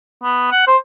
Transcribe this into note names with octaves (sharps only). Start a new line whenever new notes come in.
B3
F#5
C5